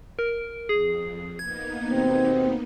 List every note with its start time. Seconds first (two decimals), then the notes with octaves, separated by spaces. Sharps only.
0.19 A#4
0.69 F2 G#4
1.39 A#3 B3 D#4 G#6
1.89 D#2 B2 C4